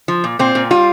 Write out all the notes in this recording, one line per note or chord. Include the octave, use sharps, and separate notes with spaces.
F3
A#2
A#2 C4
A#2
G3 F4